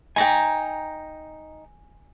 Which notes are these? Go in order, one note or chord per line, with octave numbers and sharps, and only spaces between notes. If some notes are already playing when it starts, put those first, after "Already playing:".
D#4 G5 G#5 A#5